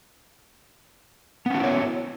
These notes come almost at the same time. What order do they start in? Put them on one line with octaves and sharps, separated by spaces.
B3 C#4 F#4 E4 C#5